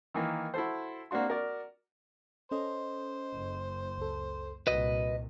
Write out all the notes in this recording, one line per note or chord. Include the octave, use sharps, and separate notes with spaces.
D#3 E3 A#3
E4 F#4 A4 C5
A#3 C4 D4 F#4 C6
F#4 A#4 D5
C#4 A4 C5 D#5
F#1
C#2 A4
C2 A#2 F#4 B4 D#5